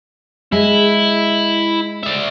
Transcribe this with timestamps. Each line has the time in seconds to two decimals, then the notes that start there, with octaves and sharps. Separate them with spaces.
0.52 G#3 E4
2.03 D5 E5